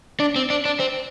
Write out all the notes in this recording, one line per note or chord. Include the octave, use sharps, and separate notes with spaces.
D4
C4
D4
D4
C4